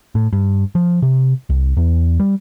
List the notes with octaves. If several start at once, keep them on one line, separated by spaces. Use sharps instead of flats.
A2
G2
F3
C3
C2
E2
G3